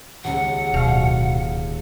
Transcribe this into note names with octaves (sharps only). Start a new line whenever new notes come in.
D#1 C#2 F#5
D1 B2 F5 F6